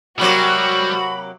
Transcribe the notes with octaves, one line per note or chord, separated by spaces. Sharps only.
C3 F#3 G3 A#3 F#4 B5